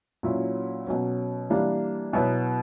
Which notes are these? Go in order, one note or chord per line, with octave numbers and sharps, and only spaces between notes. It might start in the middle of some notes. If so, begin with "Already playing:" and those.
A#2 F#3 C#4 E4
B2 F#3 C#4
E3 G3 A#3 D4
B2 F#3 B3 E4